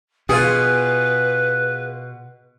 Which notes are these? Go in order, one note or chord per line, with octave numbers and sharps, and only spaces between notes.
B2 F4 G#4 B4